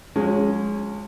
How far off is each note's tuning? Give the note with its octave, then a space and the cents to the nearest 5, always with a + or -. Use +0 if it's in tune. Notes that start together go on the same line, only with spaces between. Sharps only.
F3 +45 G#3 +0 C#4 +0